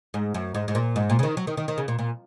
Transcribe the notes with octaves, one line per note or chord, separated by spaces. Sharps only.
G#2
F#2
G#2
G#2
A#2
G#2
A#2
C#3
D#3
F#3
D#3
D#3
D#3
C#3
A#2
A#2